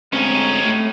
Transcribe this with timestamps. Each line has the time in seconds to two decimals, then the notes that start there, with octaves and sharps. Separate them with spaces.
0.13 D2 G#2 C4 C#4 D#4
0.65 A2